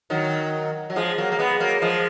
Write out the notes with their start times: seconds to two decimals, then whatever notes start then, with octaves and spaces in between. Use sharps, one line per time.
0.10 D#3 F#3
0.90 F#3
0.96 F3 G#3
1.18 F#3 A#3
1.32 A#3
1.39 G#3 B3
1.60 F#3 A#3
1.82 F3 G#3